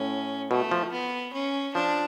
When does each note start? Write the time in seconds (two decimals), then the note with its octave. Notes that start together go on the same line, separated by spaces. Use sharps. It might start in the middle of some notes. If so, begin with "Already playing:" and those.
Already playing: A2 C#4
0.51 B2 A3
0.71 F3
0.92 B3
1.33 C#4
1.74 F3 D4